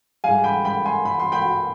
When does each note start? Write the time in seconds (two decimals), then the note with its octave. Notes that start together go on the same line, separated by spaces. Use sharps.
0.24 G#2 G3 F5 G#5
0.44 G5 B5
0.65 G5 B5
0.85 G#5 C6
1.05 B5
1.19 C6
1.32 G5 B5